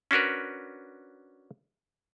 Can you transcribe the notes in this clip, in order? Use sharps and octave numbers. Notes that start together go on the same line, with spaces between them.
C#4 D4 F#4 A#4 B4